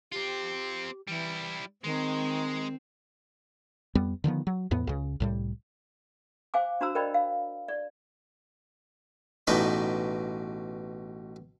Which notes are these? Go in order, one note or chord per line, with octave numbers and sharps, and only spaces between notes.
C4 F4 G4
E3 G3 E4
D#3 G#3 C4
F2 G3 B3
D3 D#3 F3 B3
F#3
E2 A2 B3
C#2 C#3
C2 A2 G3
C5 F5 G#5 D6
D4 F#4 C5 A#5 E6
A#4 C5 D5 D#5 G5 B5
F5
D5
A1 B2 D#4 D5 G5 B5